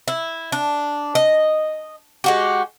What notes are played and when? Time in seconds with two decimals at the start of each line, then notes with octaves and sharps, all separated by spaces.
0.08 E4
0.52 D4
1.15 D#5
2.24 G#3 F#4 G4